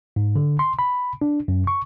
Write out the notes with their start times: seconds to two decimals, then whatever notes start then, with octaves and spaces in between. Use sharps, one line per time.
0.16 G#2
0.36 D3
0.59 C6
0.79 B5
1.22 D4
1.48 F#2
1.67 C#6